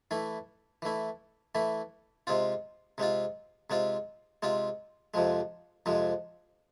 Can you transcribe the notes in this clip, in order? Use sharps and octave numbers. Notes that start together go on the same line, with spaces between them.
E3 A3 E4
E3 A3 E4
E3 A3 E4
C3 G#3 C4 F4
C3 G#3 C4 F4
C3 G#3 C4 F4
C3 G#3 C4 F4
F2 C3 F3 G#3
F2 C3 F3 G#3